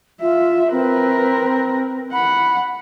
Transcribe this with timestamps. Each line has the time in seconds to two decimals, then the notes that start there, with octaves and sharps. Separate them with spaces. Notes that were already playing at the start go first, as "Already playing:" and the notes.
0.21 F4 E5
0.72 C4 A#4 B4
2.13 F#5 B5